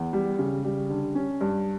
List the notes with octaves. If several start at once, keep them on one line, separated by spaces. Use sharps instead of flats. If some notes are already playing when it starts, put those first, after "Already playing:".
Already playing: E2
G3
C#3
G3
D3
C#4
G2